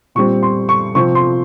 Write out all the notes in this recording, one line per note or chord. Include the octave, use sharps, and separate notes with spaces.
A#2 G3 C4 C#6
C6
C#6
C3 F3 C4 C#6
C6